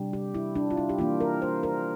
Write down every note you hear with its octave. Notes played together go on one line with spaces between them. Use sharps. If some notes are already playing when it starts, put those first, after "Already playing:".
Already playing: C3 G3 D4
G4
E4
D4
F4
E4
G4
E3 A#3 D4 F4
A#4
C5
A#4